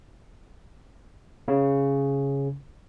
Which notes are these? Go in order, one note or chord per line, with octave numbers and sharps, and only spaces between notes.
C#3